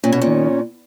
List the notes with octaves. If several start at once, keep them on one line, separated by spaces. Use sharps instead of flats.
A#2 C#4
B2
A#2
D#3